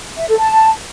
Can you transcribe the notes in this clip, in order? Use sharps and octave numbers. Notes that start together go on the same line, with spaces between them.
E5
A4
A5